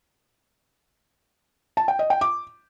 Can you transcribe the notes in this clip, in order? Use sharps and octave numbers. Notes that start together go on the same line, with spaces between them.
A5
G5
D#5
G5
D6